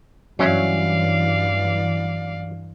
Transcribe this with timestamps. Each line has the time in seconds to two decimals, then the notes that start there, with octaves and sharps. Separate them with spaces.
0.39 G2 E3 F#3 C#4 D5 E5 F5